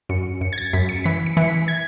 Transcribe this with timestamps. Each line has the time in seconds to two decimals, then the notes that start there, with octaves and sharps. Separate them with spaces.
0.09 F#2 C#7
0.41 F#2 C#7
0.53 G#6
0.58 A6
0.73 F#2 B6
0.89 C#7
1.04 E3 B6
1.26 C#7
1.37 E3 C#7
1.47 B6
1.68 G#6